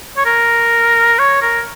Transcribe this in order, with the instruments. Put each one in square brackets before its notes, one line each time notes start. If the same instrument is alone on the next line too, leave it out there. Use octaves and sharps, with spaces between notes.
[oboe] C#5
A#4
C#5
A#4